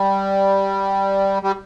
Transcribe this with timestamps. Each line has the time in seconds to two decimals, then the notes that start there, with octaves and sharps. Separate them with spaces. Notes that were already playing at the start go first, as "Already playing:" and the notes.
Already playing: G3
1.43 G3